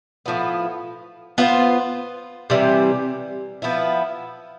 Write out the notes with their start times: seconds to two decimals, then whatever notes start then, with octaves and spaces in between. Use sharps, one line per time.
0.26 A2 F3 B3
1.38 B3 F4 C5
2.50 C3 E3 G3 C4
3.62 F3 B3 E4